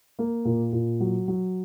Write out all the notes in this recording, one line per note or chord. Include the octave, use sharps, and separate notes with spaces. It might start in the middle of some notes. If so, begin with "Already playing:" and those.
A#3
A#2
A#2
F#3
F#3